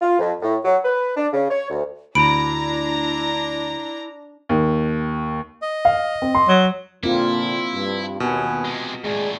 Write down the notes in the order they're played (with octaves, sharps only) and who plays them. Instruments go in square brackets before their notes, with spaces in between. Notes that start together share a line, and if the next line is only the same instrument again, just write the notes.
[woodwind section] F4
F2
A2
F#3
B4
D4
C#3
C#5
D2
[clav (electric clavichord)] D2 [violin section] D4 A#5 [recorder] E4 [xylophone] B5 D7
[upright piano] D#2
[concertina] D#5
[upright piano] F5
C4
C6
[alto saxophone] F#3
[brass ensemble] A#2 D3 [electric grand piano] A#3 [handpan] C4 F4 [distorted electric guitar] E4
[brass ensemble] G2
[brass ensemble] D#2 B3 G#5 [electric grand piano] B2
[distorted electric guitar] C3 G#3
[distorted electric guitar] D#2 A2 [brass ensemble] G#3 G#4 D5